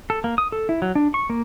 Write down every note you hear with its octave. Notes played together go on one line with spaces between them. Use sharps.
A4
A#3
D#6
A4
E4
F#3
D4
C#6
A#3